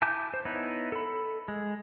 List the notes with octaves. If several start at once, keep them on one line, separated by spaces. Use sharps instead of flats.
E4 G#5 A5 D6 G6
C5
B3 D#4 E4 C#5
A4 B5
G#3